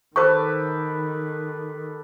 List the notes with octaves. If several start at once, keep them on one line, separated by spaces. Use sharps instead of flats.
D#3 G4 A4 B4 C5 C#6